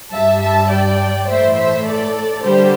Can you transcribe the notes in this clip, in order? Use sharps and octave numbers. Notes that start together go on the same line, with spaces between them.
G2 G3 E5 A5
E5 A5
D5 G5
A2 E3 A3 C5 E5
C5 E5
A4 D5
D3 G3 G4 C5